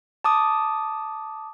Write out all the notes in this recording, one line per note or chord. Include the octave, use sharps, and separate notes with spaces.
A5 D6 D#6